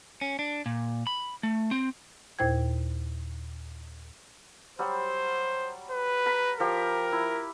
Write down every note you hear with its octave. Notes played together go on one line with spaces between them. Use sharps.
C#4
D4
A#2
B5
A3
C4
D#2 A#2 E4 C5 G5 G#6
F#3 G3 C5
B4
A#4 B5
F3 G4 A#4
E4